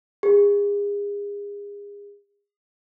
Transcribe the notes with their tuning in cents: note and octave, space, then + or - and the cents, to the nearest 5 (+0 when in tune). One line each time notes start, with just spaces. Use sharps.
G#4 -35